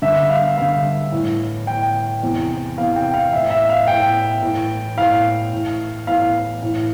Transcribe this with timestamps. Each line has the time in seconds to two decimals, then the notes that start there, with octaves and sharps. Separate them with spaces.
0.02 G2 D3 E5
0.29 F5
0.58 G2 D3 F5
1.12 A2 E3
1.67 A2 E3 G5
2.23 E2 C3 E3
2.78 E2 C3 E3 F5
2.96 G5
3.14 F5
3.32 A2 E3 E5
3.50 E5
3.69 F5
3.87 A2 E3 G5
4.42 A2 E3
4.97 A2 E3 F5
5.53 A2 E3
6.07 A2 E3 F5
6.63 A2 E3